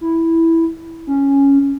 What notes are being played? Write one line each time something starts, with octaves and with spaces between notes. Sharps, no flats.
E4
C#4